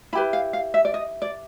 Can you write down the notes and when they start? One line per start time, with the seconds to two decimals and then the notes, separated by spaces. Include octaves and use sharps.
0.13 E4 G4 B4 B5
0.33 F5
0.53 F5
0.74 E5
0.85 D5
0.94 D#5
1.22 D5